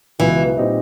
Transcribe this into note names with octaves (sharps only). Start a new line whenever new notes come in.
C#2 B2 E3 F#3
A#2 G3 C4 D#4 G4